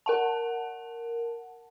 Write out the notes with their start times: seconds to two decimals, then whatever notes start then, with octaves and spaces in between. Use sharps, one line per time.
0.06 A#4 F#5 A5